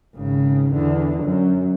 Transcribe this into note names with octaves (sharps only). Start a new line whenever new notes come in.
G#1 C#3
E2 D3
F#2